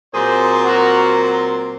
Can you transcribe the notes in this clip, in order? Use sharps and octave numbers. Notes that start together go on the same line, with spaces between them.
A#2 F#3 C4 G#4 C5
F#4 A#4